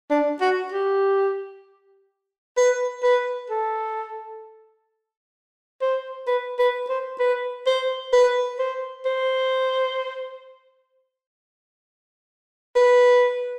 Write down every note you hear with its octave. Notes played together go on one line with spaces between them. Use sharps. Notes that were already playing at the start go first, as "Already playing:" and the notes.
D4
F#4
G4
B4
B4
A4
C5
B4
B4
C5
B4
C5
B4
C5
C5
B4